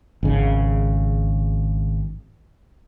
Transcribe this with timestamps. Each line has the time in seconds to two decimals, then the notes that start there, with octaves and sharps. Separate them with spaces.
0.23 G#1 C#3